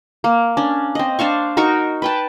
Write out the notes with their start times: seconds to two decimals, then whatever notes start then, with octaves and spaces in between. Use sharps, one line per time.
0.24 A#3
0.57 C#4 D4
0.95 C4 D#5
1.19 D4 C5 F5 C#6
1.57 D#4 F#4 A#4 C#6
2.02 B4 G5 A5